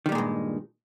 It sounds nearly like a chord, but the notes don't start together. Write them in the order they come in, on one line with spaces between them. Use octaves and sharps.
D#3 G3 A#2 G#3 G2